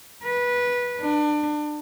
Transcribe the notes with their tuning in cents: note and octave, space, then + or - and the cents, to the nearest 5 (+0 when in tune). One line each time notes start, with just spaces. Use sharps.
B4 -15
D4 +25